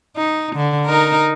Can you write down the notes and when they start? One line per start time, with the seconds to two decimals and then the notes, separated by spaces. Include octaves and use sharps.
0.16 D#4
0.56 D3
0.86 D#4 A#4